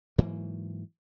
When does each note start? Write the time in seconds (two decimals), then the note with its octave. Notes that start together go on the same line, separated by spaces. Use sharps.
0.18 G#2 E3 F#3 A#3